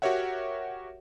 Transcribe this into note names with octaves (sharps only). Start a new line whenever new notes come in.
F#4 G4 A#4 C#5 E5 F#5